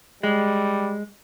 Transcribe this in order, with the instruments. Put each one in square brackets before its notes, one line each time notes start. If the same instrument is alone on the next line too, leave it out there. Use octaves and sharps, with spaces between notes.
[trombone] G3 [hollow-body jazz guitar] G#3